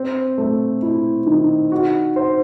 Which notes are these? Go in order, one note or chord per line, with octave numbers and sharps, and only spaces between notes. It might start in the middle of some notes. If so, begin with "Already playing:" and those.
Already playing: C4
A3
E4
D#3
F#4
C5